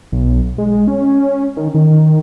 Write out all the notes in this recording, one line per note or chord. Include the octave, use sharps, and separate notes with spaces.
B1
G#3
C#4
D#3
D#3